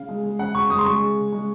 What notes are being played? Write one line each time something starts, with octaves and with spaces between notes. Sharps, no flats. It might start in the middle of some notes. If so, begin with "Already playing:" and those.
Already playing: C#3 F5
G#3
G#3
C#3 F#5
C#3 C#6
G#3 D#6
C6
G#3 C#6
C#3
C#3
G#3